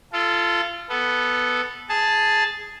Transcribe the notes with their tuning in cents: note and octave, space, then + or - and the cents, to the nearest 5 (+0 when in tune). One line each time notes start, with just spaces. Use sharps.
F4 -25 A4 +0
B3 +0 A4 -10
G#4 +0 A5 +0